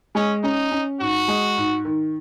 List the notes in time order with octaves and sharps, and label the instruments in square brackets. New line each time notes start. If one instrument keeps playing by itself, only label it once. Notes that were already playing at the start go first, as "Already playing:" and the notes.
[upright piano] G#3 [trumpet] C#4
[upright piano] C#4 [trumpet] D#4
[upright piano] C#4
[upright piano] G#2 [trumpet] F#4
[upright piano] G#3
G#2
D#3